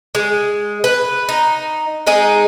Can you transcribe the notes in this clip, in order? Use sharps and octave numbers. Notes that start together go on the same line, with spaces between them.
G#3
B4
D#4
G#3 D#4 G#4